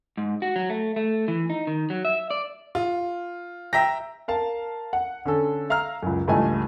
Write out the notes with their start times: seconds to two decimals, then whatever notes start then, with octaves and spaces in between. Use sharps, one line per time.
0.18 G#2
0.42 F#4
0.56 F#3
0.70 A3
0.96 A3
1.28 E3
1.50 D#4
1.67 D#3
1.90 F#3
2.05 E5
2.31 D5
2.75 F4
3.73 E5 G5 A#5 A#6
4.28 A#4 F5 A5
4.93 F#5
5.26 D3 C#4 A4
5.70 E5 F5 A#5 E6 F6
6.03 C#2 F#2
6.27 C#2 G2 E3 A3 D#5 G#5